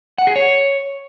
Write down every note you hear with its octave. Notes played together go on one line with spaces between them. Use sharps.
F#5
G#4
C#5